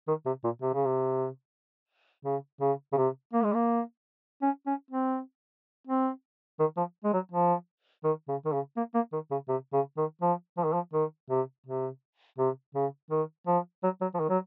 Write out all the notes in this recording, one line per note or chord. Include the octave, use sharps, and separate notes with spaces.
D#3
C3
A#2
C3
C#3
C3
C#3
C#3
C#3
C3
A#3
G#3
A#3
C#4
C#4
C4
C4
D#3
F3
G#3
F#3
F3
D#3
C#3
D#3
C#3
A#3
A#3
D#3
C#3
C3
C#3
D#3
F3
F3
D#3
F3
D#3
C3
C3
C3
C#3
D#3
F3
F#3
F#3
F3
D#3
F#3